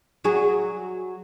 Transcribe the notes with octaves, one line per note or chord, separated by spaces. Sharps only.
F#3 F#4 G#4